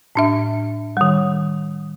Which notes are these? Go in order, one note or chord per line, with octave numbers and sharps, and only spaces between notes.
A2 D4 E5
D#3 G3